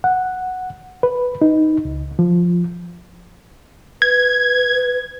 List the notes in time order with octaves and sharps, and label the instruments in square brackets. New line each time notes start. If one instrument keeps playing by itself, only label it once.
[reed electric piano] F#5
B4
D#4
C#2
F3
[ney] B4 [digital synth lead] G#6